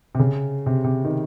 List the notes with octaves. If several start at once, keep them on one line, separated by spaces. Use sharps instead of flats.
C3
C#3
C3
C3
D#3